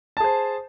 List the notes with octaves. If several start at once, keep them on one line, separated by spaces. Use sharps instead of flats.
G#4 C5 A5